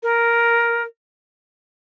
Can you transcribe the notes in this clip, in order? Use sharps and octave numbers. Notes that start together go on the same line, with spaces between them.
A#4